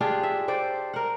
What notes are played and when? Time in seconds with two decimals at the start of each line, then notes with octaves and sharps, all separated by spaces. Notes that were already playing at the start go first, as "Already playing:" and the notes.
0.01 D4 F4 G4 G#4
0.23 E5
0.48 C5 D5 G5
0.94 A#4 F#5